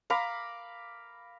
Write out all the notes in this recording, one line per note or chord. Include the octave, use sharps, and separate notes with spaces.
F5 A#5 B5 D6